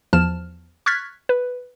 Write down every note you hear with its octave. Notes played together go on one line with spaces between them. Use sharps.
E2 F3 A5 F6 E7
C#6 F6 F#6 G#6 A6 B6
B4